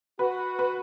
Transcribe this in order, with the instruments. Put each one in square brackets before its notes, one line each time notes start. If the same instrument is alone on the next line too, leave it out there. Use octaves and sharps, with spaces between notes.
[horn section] F#4 [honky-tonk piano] B4
[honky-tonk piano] B4